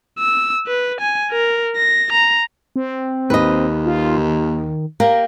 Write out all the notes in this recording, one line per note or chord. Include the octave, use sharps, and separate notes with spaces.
E6
B4
G#5
A#4
A#6
A#5
C4
D#2 B4 D#5
F4
D#3
A#3 G4 A#4